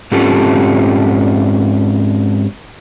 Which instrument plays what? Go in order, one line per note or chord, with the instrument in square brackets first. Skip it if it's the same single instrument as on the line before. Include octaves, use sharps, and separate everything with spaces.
[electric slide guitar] G#2 C4 C#4 F4 G4 A4